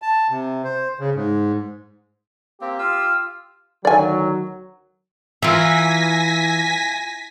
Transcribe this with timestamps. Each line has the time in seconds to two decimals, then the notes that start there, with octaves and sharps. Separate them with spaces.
0.02 A5
0.30 C3
0.64 C5
1.00 C#3
1.15 G#2
2.61 A#3 C4 G4
2.79 F4 F5 E6
3.85 D2 D#3 F#3 D5 G#5
5.42 E3 F4 A#4 E5 G#5 A#6 B6